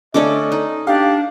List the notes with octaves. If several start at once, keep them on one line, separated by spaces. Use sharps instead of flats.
D3 A3 C#4 D4 A4 D#5 D6
D#4
D4 G4 F5